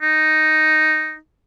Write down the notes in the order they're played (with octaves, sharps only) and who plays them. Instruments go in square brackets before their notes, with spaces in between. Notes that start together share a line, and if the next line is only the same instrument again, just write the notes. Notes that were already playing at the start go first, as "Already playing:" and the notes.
[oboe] D#4